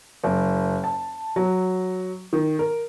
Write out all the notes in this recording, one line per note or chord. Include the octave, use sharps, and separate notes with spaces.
F#1
A5
F#3
D#3
A#4